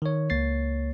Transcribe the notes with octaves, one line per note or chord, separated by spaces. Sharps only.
D#3 C#5
C#2 A#3 C#5 A6 C7